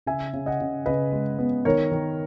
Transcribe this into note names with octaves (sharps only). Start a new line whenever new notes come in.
C#3 E5 G#5
C#3
D#5 F#5
C#3
C#3 B4 D#5
G#3
B3
D#3 A#4 C#5
D#3